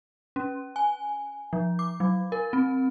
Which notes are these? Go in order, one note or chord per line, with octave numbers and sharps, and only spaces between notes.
C#4
G#5
F3
D6
F#3
A#4
C4